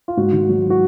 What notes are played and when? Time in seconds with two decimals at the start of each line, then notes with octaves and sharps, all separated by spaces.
0.08 F4
0.17 G#2 F#4
0.32 D#3
0.49 F#3
0.70 F#4